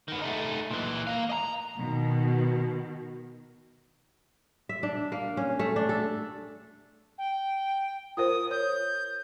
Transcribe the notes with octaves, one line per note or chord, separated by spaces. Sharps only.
D#3 B3
A3 D#4
A#2 E3
A#3 F5
D#5 A#5
B2 D#3
E5
D4
A#3
C#4
A3
D4
A4
G5
F4 A#4 C5 D#6
C#5 G6